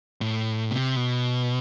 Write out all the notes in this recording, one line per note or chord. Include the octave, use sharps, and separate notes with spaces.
A2
C3
B2